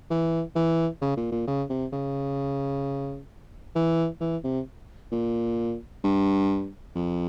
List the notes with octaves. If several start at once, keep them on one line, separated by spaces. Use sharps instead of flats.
E3
E3
C#3
A#2
A#2
C#3
C3
C#3
E3
E3
C3
A#2
G2
F2